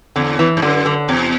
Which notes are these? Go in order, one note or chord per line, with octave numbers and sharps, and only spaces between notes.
E2 D3
E3
G2
F#2 D3
D3
E2 C3